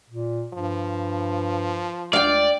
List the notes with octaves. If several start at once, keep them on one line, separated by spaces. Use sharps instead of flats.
A#2
G2 F3
C#2 D5 F5 G5